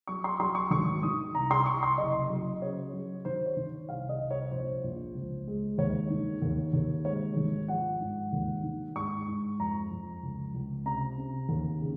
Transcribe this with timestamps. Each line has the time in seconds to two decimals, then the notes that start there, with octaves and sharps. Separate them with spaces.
0.07 F#3 C#6
0.24 C6
0.40 F#3 C6
0.55 C#6
0.71 G#1 C#6
1.03 D#3 D#6
1.35 C2 A#5
1.51 C6
1.66 C2 C#6
1.83 C6
1.98 F#1 D#5
2.30 F#3
2.61 C#3 C#5
2.93 F#3
3.25 D#3 C5
3.46 C#5
3.57 D#3
3.88 C2 F5
4.09 D#5
4.20 C2
4.31 C#5
4.51 A#1 C5
4.84 A#1
5.15 C#2
5.47 G#3
5.78 D#2 C#5
6.10 D#3
6.42 D#2
6.73 D#2
7.05 G#3 C#5
7.37 G#1
7.68 F3 F#5
8.01 G#2
8.33 D#2
8.63 D#3
8.95 G#2 C#6
9.28 G#2
9.59 F2 A#5
9.91 F2
10.23 C#2
10.54 C#2
10.85 C3 A#5
11.18 C3
11.49 D#2
11.81 C#3